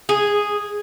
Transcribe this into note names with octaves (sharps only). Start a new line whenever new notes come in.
G#4